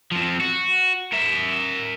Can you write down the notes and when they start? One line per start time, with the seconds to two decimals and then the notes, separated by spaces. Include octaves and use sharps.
0.11 F3 C4
0.41 F#4
1.12 A#4 E5